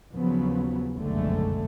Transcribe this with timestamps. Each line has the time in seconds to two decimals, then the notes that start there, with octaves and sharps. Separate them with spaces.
0.12 D#2 C#3 F3 F#3 B3
0.96 F#1 B1 F2 D3 G#3 A3